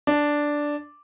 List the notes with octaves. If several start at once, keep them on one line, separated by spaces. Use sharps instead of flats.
D4